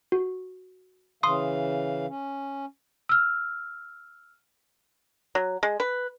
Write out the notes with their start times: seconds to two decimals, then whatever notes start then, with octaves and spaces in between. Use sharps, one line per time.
0.12 F#4
1.23 C#3 E3 F5 C6 D#6
2.09 C#4
3.09 E6 F6
5.35 F#3
5.63 G#3
5.80 B4